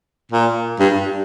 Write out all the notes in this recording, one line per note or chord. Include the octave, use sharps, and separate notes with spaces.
A#2
G2